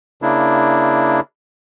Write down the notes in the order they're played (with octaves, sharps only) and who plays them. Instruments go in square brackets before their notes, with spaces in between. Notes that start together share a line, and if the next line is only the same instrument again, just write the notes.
[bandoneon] C#3 A#3 D4 E4